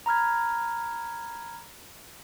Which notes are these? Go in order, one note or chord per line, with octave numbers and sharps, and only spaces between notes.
A#5 B5 F6 G#6